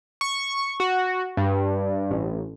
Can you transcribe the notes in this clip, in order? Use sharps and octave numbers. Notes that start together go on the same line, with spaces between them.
C#6
F#4
G2
A1